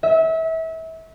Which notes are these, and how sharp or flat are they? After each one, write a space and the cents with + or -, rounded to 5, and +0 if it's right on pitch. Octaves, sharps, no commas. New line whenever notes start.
E5 -30